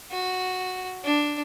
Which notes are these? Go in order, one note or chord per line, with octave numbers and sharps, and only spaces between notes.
F#4
D4